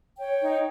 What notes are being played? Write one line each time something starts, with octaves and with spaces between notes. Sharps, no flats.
C#5 G5
D#4